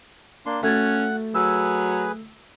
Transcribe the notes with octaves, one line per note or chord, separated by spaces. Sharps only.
A#3 D4 C6
A3 C#4 F#4 F#5 G#6 A6
F#3 G#4 B4 E6